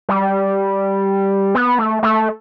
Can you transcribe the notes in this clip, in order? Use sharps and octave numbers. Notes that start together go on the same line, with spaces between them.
G3
B3
A3
A3